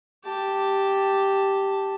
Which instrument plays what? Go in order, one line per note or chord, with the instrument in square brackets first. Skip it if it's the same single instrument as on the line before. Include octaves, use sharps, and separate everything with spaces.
[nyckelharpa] G4 A5